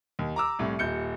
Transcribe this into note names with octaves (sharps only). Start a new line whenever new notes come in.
D#2
A#5 D6 E6
C2 A2
D#1 G6 C#7